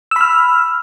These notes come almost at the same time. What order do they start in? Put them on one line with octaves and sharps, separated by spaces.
E6 B5 F6